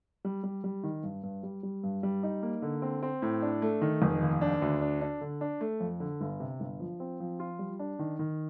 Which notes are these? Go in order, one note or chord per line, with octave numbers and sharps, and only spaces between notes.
G3
G3
G3
D#3
G2
G2
G3
G3
G2
G3
D#4
A#3
D3
C4
C4
A2
D4
A3
D#3
F1
D#2
D4
D2
D4
D4
D3
D4
A3
F2
D3
G1
C3
G1
F3
C4
F3
F4
G3
D4
D#3
D#3